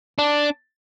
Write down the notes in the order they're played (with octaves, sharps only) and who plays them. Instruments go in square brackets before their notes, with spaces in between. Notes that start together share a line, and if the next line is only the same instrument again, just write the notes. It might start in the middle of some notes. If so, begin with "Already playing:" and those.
[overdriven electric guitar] D4